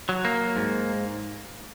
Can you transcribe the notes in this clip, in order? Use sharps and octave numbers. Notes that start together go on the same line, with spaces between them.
F#3
A#3
G#2